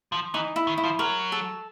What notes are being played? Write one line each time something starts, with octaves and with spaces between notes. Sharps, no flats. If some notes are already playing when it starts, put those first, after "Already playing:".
F3
E3 D#4
E4
D#3
E4
F3
F#3 A#4
A4